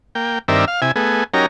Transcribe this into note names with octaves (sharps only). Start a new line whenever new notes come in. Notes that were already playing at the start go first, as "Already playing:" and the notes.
A#3 G5
G2 D#3 C4 A#4 D5 E5
F5
C3 E4 G#5
A3 B3 G#4
F#3 C#4 D#4 G4 A#4 A#5